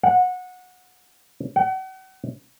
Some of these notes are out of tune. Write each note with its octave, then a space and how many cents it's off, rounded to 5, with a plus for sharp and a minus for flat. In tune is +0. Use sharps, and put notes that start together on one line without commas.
F#5 -20
F#5 +40